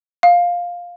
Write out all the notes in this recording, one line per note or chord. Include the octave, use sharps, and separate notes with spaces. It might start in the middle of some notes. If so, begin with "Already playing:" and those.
F5